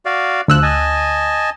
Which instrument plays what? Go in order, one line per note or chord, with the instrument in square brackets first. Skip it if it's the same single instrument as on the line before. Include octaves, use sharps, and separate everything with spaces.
[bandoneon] F#4 D5 F5
[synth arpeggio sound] D2 E6 F#6 [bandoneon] F3
[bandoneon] D#5 G#5 A5